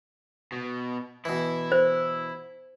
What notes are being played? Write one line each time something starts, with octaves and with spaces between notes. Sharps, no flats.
B2
B2 E3 E4
C5